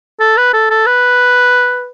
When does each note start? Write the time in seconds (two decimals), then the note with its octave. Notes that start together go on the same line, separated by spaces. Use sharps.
0.20 A4
0.37 B4
0.53 A4
0.70 A4
0.86 B4